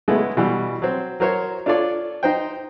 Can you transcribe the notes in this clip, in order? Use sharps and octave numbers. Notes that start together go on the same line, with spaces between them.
C#3 G#3 A3 B3 E4
B2 E3 G3
F#3 C4
F#3 A#4 C5 C#5
D4 F4 A4 C#5 D5
D#4 C5 G5